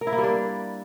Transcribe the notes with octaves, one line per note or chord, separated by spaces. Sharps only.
A#4
E4
A#3
G3
D4